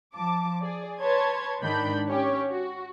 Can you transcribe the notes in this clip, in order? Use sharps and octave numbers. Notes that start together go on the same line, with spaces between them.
F3 A5 D6
G#4 D5
B4 C#5 A5 C6 G#6
G#2 D#3 D4 B5 G6
C#4 G4 C#5
F#4